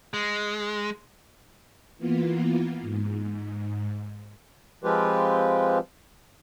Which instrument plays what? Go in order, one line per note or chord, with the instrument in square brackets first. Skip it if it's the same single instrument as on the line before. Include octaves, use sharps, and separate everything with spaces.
[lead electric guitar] G#3
[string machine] E3 A#3 B3 F4
G#2
[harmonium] F3 G#3 C4 F4 G4 B4